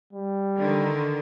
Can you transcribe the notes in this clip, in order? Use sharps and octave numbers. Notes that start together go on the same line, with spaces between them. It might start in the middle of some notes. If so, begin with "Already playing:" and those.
G3
D3 D#3